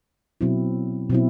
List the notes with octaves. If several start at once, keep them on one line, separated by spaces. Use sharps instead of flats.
B2 F#3 C4 E4
B2 F#3 C4 E4